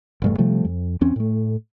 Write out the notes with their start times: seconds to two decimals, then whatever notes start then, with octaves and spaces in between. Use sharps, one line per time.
0.22 E1 G2 A3
0.38 C3 F3 G3 A3
0.65 F2
1.01 E2 C4 C#4
1.16 A2 A3